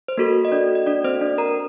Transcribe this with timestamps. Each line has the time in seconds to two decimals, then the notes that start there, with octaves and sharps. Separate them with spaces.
0.08 C5
0.18 A#3 F#4 A4 A#4
0.45 D#5
0.52 D4 D5
0.75 D#5
0.86 D4 D5
1.04 C4 C5
1.21 D4 D5
1.38 A#4 A#5